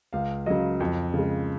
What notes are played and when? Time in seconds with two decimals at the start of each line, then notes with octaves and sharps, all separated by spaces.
0.13 C#2 F5
0.46 C#3 F#3 D#5
0.80 F2
1.14 C#3 G#3